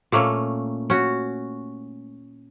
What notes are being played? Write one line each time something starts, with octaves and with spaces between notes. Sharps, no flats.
A#2 A3 A#3 C#4
C#4 F#4